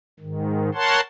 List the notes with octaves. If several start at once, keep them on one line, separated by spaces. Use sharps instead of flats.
G#2 D#3
A#4 C#5 F#5 A5 C6